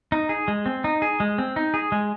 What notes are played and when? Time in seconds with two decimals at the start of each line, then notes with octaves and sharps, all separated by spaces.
0.12 D#4
0.29 G#4
0.48 G#3
0.66 C4
0.84 D#4
1.02 G#4
1.20 G#3
1.38 C4
1.56 D#4
1.74 G#4
1.92 G#3